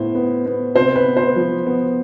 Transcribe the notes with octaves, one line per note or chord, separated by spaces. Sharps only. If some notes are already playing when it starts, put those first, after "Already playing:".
Already playing: A2 B3 C5
B3
B3
C3 C5
B4
B3
C5
F3
B3